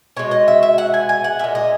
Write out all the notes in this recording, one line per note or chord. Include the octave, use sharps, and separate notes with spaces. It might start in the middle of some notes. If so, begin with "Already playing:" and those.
B2 G#3 C#5
D#5
E5
E5
F#5
G#5
G#5
F#5
A#2 G#3 E5
D#5